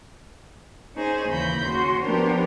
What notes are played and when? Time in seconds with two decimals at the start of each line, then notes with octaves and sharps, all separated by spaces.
0.94 C#4 D#4 G#4 C5
1.27 D#2 C#3 E3 B5 G6 A#6
1.64 C#4 F#4 C6
2.00 F3 B3 D4 G4 A#4 C5